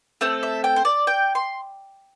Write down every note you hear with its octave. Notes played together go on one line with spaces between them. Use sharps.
A3 C4 A4
E5
G5
C5
D5
G5
C6